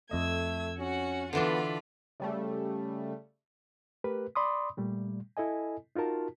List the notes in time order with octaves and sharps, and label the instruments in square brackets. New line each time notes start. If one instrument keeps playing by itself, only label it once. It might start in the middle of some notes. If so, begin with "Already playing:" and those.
[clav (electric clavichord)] F2 D#5 [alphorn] A3 [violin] E6 G#6
[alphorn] C#4 [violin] F#4 F#5
[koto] D3 E3 D4 [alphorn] B3 [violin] F4 B5
[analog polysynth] C#3 G3 A3
[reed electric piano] A3 G4 A#4 B4
D5 B5 C6 D6 D#6
A#2 G3 A3
E4 A4 D#5 G#5
D#4 F4 F#4 A#4 A5